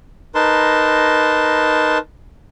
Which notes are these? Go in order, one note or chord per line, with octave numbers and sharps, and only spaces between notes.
D#4 A#4 B4 A5 C6